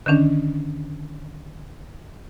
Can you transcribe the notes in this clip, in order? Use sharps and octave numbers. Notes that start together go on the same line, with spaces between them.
D3 D#3 C#4 D4